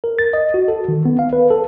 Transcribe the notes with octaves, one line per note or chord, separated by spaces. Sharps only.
A#4
A6
D#5
F#4
A4
D#3
B3
F5
B4
A4